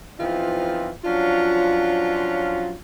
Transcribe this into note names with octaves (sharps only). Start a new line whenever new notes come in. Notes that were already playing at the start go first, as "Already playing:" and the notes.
E2 E3 F3 C4 D#4 F4
F3 F#3 C#4 D4 F4